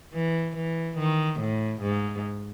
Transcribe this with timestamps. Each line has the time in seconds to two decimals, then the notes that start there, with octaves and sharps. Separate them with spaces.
0.13 E3
0.57 E3
0.98 D#3
1.40 A2
1.82 G#2